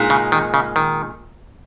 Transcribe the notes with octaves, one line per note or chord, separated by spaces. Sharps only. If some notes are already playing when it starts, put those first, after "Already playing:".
Already playing: A#2 G#3 D#4
C#3
D#3
C#3
D#3